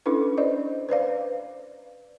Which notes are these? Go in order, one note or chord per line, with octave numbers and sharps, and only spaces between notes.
C#4 D4 E4 A4 B4
C5 D5 D#5
B4 C5 D5 F5